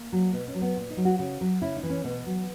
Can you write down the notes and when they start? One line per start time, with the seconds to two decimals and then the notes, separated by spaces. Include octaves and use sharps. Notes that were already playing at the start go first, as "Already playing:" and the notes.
Already playing: A#3
0.12 F#3
0.33 B2 B3
0.48 C#4
0.55 F#3
0.62 B3
0.76 A#2
0.90 D#4
0.97 F#3
1.05 F#4
1.19 C#3 F#4
1.41 F#3
1.62 C#3 E4
1.76 D#4
1.83 E3
1.90 C#4
2.04 B2 B3
2.26 F#3